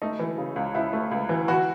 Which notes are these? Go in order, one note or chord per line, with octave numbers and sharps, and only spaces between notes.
A3 D#4
E3
C#3
C#2
C#2 E4
A3
C#2
E3
E3 F#4